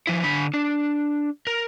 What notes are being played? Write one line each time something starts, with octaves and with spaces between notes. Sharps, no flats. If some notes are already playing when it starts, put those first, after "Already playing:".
F3 E4
D3 B5
D4
A#4